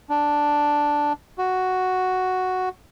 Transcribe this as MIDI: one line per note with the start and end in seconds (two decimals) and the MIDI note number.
0.09 1.13 62
1.38 2.69 66